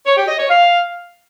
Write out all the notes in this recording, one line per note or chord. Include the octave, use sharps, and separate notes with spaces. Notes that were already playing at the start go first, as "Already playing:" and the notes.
C#5
G4
D#5
C#5
F5